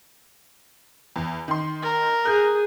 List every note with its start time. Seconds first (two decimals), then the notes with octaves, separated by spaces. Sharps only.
1.16 E2
1.48 D#3 C6
1.83 A#4
2.25 G#4 F#6 G6